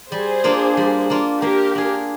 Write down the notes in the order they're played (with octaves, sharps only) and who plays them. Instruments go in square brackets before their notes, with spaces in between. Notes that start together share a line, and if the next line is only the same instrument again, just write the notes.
[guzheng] G3 [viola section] G#4 C5
[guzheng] A#3 D4 F4
G3
A#3 D4 F4
[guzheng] A#3 [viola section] G4 A#4
[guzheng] D4 G#4